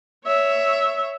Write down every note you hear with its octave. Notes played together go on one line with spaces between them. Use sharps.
C#5 E5